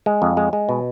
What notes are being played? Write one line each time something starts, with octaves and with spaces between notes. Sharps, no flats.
G#3
F2
G#3
G#3
B2